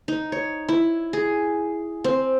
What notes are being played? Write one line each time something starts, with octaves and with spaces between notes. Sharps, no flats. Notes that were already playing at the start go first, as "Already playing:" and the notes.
D#4
C#5
E4
G#4
C4